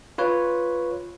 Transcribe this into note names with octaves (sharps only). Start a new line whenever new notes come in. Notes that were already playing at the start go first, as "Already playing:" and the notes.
F4 B4 C#5